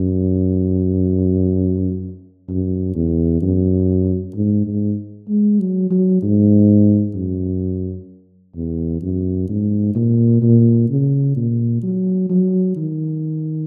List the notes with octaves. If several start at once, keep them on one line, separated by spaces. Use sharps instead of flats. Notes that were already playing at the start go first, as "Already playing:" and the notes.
Already playing: F#2
F#2
E2
F#2
G#2
G#2
G#3
F#3
F#3
G#2
F#2
E2
F#2
G#2
A#2
A#2
C#3
A#2
F#3
F#3
D#3